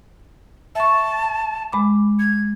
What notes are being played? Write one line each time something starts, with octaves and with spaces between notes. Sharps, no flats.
E5 A5 C#6
G#3 B5 D6
G#6